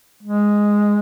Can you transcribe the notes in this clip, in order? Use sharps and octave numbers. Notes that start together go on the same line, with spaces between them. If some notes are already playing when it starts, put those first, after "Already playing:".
G#3